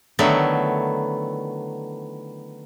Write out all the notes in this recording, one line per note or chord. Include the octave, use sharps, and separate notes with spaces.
D3 D#3 F#3 A3 B3 E4